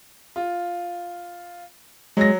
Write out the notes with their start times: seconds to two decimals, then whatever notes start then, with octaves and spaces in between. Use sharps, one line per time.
0.36 F4
2.17 F#3 G#3 A#6